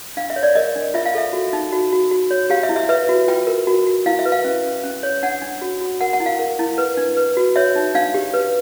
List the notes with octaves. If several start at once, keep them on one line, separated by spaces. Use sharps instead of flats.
D4 F5
E5
C#5
D5
A#4 D#5
D4
F4 E5
F5
A4 E5
F#4
D#4
F#4
F#4
F#4
C#5
G4 F5
E5
E4
E5
B4 E5
F#4
F4 G5
A#4
F#4
F#4
E4 F5
E5
B4
F5
C#4
C#4
C#4
C#5
D4 F#5
D4
F#4
F#4
A#4 F#5
F#5
E4
F5
A#4
E4
B4
D4
B4
F#4
C#5 E5
D#4
D4 F5
G4
B4